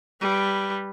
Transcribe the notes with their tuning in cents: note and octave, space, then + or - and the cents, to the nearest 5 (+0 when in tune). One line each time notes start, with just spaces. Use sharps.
G3 +0 B4 +0